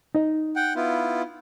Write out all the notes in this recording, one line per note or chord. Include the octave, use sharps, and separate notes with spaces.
D#4 D#5
F#5 G5
B3 E4 F4